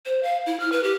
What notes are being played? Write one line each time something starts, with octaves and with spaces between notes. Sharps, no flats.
C5
F5
E4
F6
B4
G4